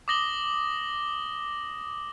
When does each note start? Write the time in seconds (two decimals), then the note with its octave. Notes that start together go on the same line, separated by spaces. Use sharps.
0.08 D6 D#6 A#6 F#7 G7